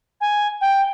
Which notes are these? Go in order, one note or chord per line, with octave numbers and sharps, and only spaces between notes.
G#5
G5